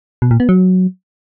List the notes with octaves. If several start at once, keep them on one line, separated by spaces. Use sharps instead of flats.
B2
A#2
B3
F#3